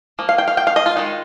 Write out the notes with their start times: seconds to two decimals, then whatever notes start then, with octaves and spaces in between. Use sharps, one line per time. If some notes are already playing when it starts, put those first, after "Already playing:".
0.19 F3 A#3
0.29 F5
0.38 G5
0.48 F5
0.57 G5
0.67 F5
0.76 D#5
0.86 F4
0.96 D#3 G#3 D#4